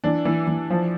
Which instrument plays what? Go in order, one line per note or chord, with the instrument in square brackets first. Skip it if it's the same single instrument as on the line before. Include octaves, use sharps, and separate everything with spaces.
[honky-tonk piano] E3 D4
E3
E3
F3